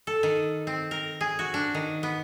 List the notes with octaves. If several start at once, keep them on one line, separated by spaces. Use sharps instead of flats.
A4
D#3
C4
A#4
G#4
F#4
D4
D#3
B3